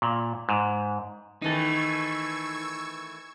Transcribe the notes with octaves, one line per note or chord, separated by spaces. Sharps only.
A#2
G#2
D#3 E3 A3 D#4 A4 C#6 E6 G#6